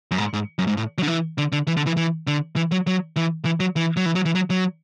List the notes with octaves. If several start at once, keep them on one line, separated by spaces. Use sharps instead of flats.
F#2
G#2
G#2
F#2
G#2
A2
F#3
D3
E3
D3
D3
E3
D3
E3
E3
D3
E3
F#3
F#3
E3
E3
F#3
E3
F#3
E3
F#3
E3
F#3
F#3